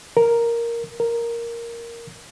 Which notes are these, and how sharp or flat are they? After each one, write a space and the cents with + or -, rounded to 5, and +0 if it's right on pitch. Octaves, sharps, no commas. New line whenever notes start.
A#4 +0
A#4 +0